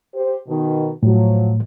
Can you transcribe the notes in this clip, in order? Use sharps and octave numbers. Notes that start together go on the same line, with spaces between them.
G4 C5
B2 D#3
A2 F3 F#3